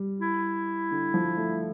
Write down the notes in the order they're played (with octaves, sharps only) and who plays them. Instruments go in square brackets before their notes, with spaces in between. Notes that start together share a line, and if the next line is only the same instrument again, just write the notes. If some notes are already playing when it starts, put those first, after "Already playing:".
Already playing: [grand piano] G3
[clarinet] E4
[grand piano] D3
F3
A3